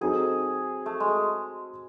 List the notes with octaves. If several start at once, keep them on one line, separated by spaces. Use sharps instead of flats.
F#3 C4 D#4 G#4 A4
A3
G#3